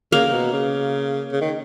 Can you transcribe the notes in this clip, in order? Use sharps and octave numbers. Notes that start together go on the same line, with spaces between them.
C#3 A#3
C#3
B2
C#3
C#3
D#3